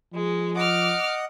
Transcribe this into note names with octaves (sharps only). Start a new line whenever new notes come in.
F3 G#3
D#5 F#5 D6 F6